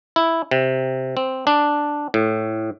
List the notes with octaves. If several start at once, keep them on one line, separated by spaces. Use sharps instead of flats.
E4
C3
C4
D4
A2